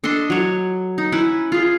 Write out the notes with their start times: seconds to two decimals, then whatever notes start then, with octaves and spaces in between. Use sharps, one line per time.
0.04 D4 A4 D#5 C6
0.30 F#3 C#5
0.98 D#4
1.12 C#4 E4 B4
1.52 F4 G#4